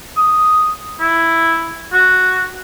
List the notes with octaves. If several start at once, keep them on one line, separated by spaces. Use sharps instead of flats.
D#6
E4
F#4